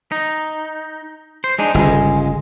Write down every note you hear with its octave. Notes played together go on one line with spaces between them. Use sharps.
D#4
C5
G#3 D4 D#4
G1 C#2 G#3